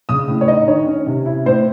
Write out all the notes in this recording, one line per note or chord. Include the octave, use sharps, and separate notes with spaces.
C#3 D#6
A2
C#5
D#4 D#5
D#3 C#5
C#4
C3
E4
A2 C5